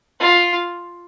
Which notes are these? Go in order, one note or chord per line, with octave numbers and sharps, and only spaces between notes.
F4